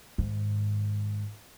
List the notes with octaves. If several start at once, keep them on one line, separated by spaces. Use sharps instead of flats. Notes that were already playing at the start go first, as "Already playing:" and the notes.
G#2 D#3